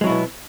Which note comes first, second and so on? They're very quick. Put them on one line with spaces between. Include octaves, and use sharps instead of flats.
G#3 F#3 E4 B2 B3